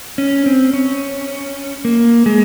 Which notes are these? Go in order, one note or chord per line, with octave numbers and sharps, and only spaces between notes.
C#4
C4
C#4
A#3
G#3